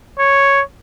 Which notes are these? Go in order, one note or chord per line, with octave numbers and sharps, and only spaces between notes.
C#5